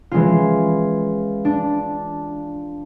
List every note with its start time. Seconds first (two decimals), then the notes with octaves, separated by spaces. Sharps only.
0.12 E3 G#3 C#4 F4
1.45 D4